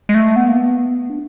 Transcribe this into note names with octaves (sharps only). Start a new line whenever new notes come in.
G#3
A3
B3
A#3
B3
D4